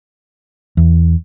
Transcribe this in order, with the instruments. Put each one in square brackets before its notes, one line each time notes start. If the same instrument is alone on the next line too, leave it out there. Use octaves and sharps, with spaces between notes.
[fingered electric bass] E2